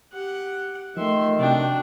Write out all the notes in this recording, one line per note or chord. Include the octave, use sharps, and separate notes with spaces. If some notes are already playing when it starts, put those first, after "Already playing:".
G4 F#5
D#3 F3 A3 E5 C6
C3 D4 F#4 G5